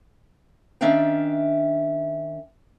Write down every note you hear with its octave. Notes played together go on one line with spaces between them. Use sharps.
D#3 C#4 D4 E5 F5 G5